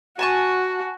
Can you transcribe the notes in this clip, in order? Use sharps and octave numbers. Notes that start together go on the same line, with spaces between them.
F#4 G#5 A5 C#6